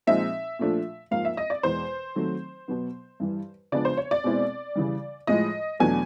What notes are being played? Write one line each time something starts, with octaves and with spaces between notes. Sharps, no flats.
A#2 F3 G#3 C4 D#4 E5
A#2 F3 A3 D4
G#2 F3 A#3 F5
E5
D#5
D5
E2 B2 G#3 C5
D#3 F#3 A3 C4
B2 F#3 B3
G2 E3 G3
C#3 F3 G#3 B3 D4 D5
C5
C#5
D5
B2 G#3 C4 E4
C#3 E3 G3
A2 F3 G#3 D#5
E2 B2 F#3 A3 D4 G#5